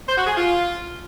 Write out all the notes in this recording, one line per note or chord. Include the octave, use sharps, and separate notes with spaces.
C5
F#4
G#4
F4